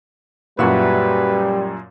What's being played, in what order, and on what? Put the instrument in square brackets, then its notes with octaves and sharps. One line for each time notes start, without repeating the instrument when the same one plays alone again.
[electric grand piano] F#2 A#2 [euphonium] G3 [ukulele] F#4 E5 [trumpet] B4